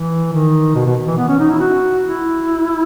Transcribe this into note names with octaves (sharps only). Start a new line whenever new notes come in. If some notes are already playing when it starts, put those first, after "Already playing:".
Already playing: E3
D#3
B2
B2
E3
B3
C#4
D#4
E4
F#4
E4